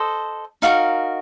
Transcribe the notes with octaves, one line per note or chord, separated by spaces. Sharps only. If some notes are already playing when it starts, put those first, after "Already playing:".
Already playing: A4 C5 D#5
D#4 F#4 A#4 F5